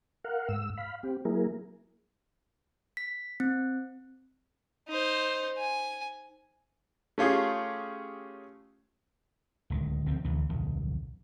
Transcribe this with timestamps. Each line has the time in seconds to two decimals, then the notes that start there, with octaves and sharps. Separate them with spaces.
0.24 A#4 F5 F#5
0.49 G#2 E6
0.77 F5 B5
1.03 C4 G4
1.25 F#3 A#3 E4 G#4 A#4
2.97 B6
3.40 C4
4.88 D#4 C5
5.58 G#5
7.18 A3 C#4 F4 G4 G#4
9.70 D1 C#2 D#3
10.07 B1 F3 C4
10.24 A1 D2 C3 E3
10.50 D1 B1 F2 D#3